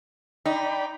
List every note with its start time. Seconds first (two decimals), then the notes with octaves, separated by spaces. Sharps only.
0.46 D#4 D5 G5 B5